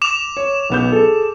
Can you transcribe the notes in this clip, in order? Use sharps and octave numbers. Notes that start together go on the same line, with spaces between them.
D6 E7 F7
C#5
B1 B3 G6
G#4 A4